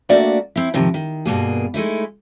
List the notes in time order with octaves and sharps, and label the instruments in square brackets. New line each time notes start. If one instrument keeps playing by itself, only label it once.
[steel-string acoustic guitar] A3 A#3 D4 F#4 D5 E5
C4 E4
G#2 C3 D#3 F3
D#3
G2 B2 A#3 G#4
G#3 A3 D#4 E4